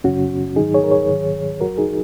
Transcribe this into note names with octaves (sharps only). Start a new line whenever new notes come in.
F#2 C#3 F#3 C#4 F#4
G#2 D#3 F#3 D#4 G#4
G#4 C#5
A#4
G#4 C#5
G#2 D#3 F#3
F#2 F#3 F#4 A#4
D#4 G#4